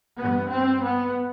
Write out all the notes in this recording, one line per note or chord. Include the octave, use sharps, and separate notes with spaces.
G2 B3
C4
B3